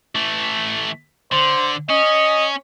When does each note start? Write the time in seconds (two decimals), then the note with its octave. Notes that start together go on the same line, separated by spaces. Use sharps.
0.15 E3 A3
1.32 D3 C5
1.89 C#4 D#5